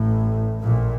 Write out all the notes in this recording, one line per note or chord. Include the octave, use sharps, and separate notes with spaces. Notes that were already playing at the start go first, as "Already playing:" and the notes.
Already playing: A1 A2
A#1 A#2